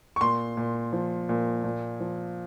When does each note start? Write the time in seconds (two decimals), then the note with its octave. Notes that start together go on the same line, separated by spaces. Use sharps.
0.16 C#6
0.21 A#2 C6
0.57 A#2
0.93 F3
1.29 A#2
1.64 A#2
2.00 F3